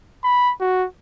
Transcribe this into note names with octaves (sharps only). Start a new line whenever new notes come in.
B5
F#4